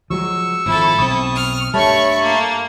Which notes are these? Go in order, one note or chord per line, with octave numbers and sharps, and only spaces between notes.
F3 F#3 G#3 C#6 E6
G#1 F3 E4 A4
B1 C4 C#6 D#6
F6
G2 G3 A3 C#5 A5 B5 C#6
A#3